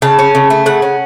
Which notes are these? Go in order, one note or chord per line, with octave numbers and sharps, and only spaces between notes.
C#3 A5
C#4
C#3
A3
C#3 F#5
C#4